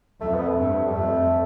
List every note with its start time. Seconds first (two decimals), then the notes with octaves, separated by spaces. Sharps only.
0.21 F2 A3
0.34 B3
0.48 A3
0.57 G2
0.86 G3
0.92 F2 A3